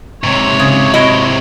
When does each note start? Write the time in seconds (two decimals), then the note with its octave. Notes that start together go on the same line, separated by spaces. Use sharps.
0.24 G#2 C3 C#5
0.59 C#3
0.93 E4 F#4 D#5